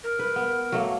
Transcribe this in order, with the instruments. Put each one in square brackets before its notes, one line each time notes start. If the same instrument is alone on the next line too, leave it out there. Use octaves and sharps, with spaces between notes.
[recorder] A#4
[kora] B4
B3
F#3 A3 A#3